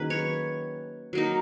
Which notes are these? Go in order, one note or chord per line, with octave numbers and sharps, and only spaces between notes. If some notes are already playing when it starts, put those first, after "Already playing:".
Already playing: D#3 F#3 A#3 C#4 G#4 B4
C#5
F#3 A#3 D#4